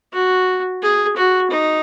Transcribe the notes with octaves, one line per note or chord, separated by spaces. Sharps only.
F#4
G#4
F#4
D#4